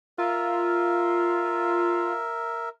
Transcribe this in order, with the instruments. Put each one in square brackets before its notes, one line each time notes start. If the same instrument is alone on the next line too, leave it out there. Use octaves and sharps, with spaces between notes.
[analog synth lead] F4 [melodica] A#4 E5